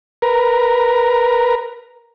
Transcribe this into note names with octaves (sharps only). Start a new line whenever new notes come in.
A#4 B4 A#5